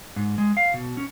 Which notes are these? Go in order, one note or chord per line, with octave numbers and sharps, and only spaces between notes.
G#2
G#3
F5
B2
C#4